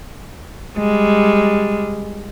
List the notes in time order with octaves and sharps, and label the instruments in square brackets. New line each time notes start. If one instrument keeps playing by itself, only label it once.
[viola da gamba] G3 G#3